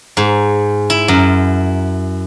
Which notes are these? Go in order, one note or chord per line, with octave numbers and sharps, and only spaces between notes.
G#2
E4
F#2